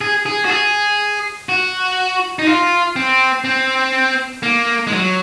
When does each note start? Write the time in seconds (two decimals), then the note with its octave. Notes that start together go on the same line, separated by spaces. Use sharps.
0.01 G#4
0.26 G#4
0.45 F#4
0.49 G#4
1.49 F#4
2.39 D#4
2.47 F4
2.96 C4
3.44 C4
4.43 A#3
4.87 G#3
4.93 F#3